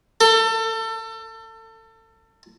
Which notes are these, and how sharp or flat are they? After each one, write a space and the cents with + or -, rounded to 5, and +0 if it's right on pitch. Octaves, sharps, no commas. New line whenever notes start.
A4 +30